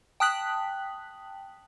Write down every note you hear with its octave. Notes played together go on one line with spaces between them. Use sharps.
G5 A5 D#6 F#6 B6 F#7